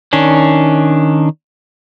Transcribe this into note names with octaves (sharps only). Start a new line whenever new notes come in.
D#3 C#4 D4